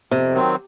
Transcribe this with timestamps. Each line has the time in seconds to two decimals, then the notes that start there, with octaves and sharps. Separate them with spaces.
0.11 F2 C3
0.33 D#3 F#3 C4